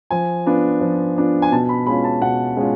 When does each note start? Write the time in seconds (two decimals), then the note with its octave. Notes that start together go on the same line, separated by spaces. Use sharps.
0.10 F3 G#5
0.46 B3 D4 F4
0.81 F3
1.16 B3 D4 F4
1.42 G#5
1.52 B2 A5
1.69 B5
1.86 G#3 C#4 F4 B5
2.04 A5
2.22 B2 F#5
2.57 G#3 C#4 F4